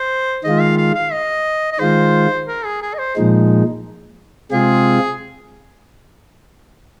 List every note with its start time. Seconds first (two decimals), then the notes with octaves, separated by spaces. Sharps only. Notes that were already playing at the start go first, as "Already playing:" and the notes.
Already playing: C5
0.44 D#3 G#3 F4 D#5
0.60 F5
0.78 F5
0.95 F5
1.12 D#5
1.72 D#5
1.79 D#3 G#3 F4 C5
2.48 A#4
2.65 G#4
2.82 G#4
2.94 D#5
2.99 C5
3.16 A#2 F3 G#3 D#4
4.51 C3 G#3 C4 F4 G#4